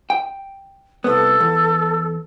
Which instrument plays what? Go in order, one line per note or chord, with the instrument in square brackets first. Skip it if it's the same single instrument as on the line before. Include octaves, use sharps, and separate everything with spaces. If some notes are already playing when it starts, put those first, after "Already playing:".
[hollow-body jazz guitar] G5
[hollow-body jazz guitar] C2 B3 [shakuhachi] A4
[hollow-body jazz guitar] E2